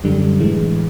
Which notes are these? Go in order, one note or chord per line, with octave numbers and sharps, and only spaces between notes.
F#2 D3 G3
A2 E3 G#3